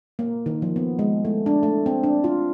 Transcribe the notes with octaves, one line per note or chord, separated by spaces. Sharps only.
A#3
D#3
F3
B3
G#3
A3
D4
A3
C4
D4
F4